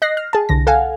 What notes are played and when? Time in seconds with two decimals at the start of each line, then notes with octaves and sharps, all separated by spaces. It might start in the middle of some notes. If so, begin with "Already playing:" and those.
0.02 D#5 F#6 A#6 C7
0.17 F6
0.33 G#4 A5
0.49 C2 D3 A#6
0.67 A4 F5 F#5 G#5